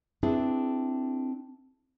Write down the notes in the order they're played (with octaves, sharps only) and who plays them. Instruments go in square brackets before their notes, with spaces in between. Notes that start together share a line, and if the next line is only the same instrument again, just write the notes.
[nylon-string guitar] C4 D4 E4 G#4 B4